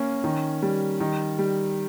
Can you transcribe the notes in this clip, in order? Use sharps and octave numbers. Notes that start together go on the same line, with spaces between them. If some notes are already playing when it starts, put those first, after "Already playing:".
Already playing: A#3 C#4
D#3
G3
D#3
G3